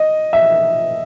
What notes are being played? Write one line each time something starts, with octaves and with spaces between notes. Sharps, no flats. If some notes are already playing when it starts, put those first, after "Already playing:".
Already playing: D#5
E5